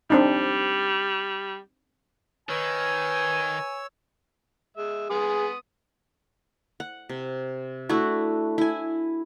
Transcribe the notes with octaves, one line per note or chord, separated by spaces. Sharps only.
G3 C4 D4 D#4
D#3 B4 C#5 G#5 E6
G#3 E5
B3 G#4 C6 D#6
F#5
C3
A3 D4 E4 F#4
E4 G#5